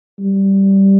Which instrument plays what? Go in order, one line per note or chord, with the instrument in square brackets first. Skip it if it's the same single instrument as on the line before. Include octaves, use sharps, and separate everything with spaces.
[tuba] G3